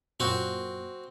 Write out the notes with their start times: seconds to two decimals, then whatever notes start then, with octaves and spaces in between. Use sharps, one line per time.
0.20 F#2 A#2 C4 F#4